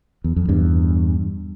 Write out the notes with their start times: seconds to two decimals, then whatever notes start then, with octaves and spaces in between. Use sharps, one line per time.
0.24 E2
0.36 F2
0.49 E2 G2